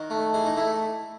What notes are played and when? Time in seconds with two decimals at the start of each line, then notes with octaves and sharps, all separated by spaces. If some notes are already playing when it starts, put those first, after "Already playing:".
Already playing: D#3 F#4
0.10 A3
0.33 E3 G#4
0.45 D#4
0.57 A3 E4